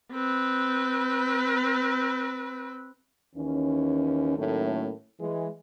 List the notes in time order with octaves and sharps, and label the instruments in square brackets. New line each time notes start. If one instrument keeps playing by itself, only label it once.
[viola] C4 B4
[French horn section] D#2 D#3 E3 C#4
A2 D#3 F#3 A3 A#3 C#4
E3 G#3